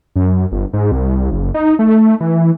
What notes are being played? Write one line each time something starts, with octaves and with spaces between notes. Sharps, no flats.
F#2
G1
G#2
C2
F#1
D#4
A3
E3